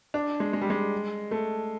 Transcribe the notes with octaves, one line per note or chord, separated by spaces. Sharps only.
D4
G#3
G#3
G3
G#3
A3